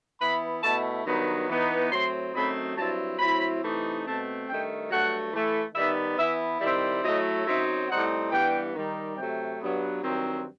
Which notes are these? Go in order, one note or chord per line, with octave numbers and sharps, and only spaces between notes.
E3 B3 E4 B5
B2 A3 E4 A5
G2 D#3 F#3 B3 D#4 B5
E3 B3 D#4
A2 F#3 C4 C6
F#2 F#3 A3 C4 D#4 B5
G2 F#3 C4 E4 A5
A2 F#3 C4 E4 B5
C3 E3 A3 D#4
B2 A3 C4 A5
G2 D#3 A3 G5
G2 F#3 A3 F#5
E3 A3 E4
D#3 G3 B3 D#4 E5
E3 B3 E4 E5
D#3 G3 C4 E4 E5
A2 F#3 A3 E4 D#5
F#2 F#3 C4 D#4 E5
A2 G3 C4 D#4 F#5
G2 E3 G3 B3 G5
D#3 G3 D#4
C3 F#3 A3 G5
G2 F#3 B3
G2 D#3 F#3 C4